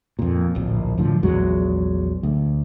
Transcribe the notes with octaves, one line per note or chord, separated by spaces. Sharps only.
F2 A#2
D1 A#1
F#2 A2 D3 F3
A#1 E2 F#3 G#3
D2